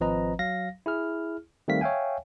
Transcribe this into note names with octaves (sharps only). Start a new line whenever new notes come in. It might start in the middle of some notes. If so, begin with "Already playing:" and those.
G#1 F3 C4 B4 D#5 A#5
F#3 F5 A#6
E4 G#4 F6
D#3 G3 A3 C4 F5 B6
C#5 E5 F5 G5 G#5